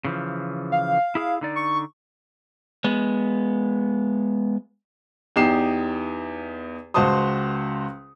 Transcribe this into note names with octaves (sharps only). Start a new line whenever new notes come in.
C#3 E3 F3
F5
E4 G#4
D3 D#4 D5
C#6
G#3 B3
E2 D#4 G4 C7 E7
C#2 F#4 C5 A5 C6 D#6